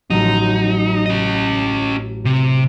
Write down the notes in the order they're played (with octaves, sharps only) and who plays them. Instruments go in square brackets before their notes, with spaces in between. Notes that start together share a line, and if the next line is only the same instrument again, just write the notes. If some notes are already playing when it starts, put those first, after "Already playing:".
[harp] A1 F#3 [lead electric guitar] D#4
[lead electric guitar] C#4 D#5
C3